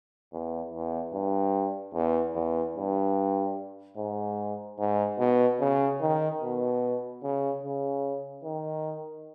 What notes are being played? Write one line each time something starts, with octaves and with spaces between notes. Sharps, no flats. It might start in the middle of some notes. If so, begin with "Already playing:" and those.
E2
E2
G2
E2
E2
G2
G#2
G#2
B2
C#3
D#3
B2
C#3
C#3
D#3